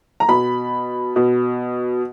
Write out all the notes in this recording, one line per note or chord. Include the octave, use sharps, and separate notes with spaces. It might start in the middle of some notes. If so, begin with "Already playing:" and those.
A#5
B2 B5
B2